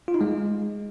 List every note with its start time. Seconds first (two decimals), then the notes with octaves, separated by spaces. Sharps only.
0.08 F4
0.14 D#4
0.21 G#3